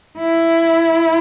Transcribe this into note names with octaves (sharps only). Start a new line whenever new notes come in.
E4